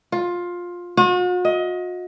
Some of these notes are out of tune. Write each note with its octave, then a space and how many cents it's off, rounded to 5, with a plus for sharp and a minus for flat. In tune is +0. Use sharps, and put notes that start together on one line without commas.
F4 +15
F#4 -45
D#5 +25